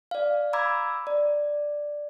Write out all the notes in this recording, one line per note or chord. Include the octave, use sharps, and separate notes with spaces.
D5 F5
A#5 B5 D6 E6 G#6
D5